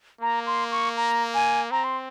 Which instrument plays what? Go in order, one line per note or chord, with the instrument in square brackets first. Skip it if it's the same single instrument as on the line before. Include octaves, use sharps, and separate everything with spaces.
[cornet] A#3 [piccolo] A#5
[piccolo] C6
C#6
A#5
G#5
[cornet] C4 [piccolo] A#5
[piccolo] C6